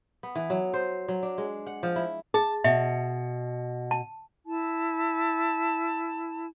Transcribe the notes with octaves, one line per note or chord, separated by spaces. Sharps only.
B3
E3
F#3
C5
F#3
D4
G#3
F#5
F3
E4
G#4 A5
B2 E5
A5
E4 A5